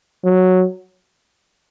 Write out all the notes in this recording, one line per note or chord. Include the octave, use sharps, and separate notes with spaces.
F#3